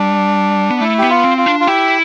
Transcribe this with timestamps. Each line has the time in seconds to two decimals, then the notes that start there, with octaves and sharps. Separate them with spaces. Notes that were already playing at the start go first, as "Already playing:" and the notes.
Already playing: G3 D4
0.70 B3
0.81 A3 E4
0.99 B3 G4
1.10 F4
1.24 C4
1.38 F4
1.46 D4
1.60 F4
1.67 E4 G4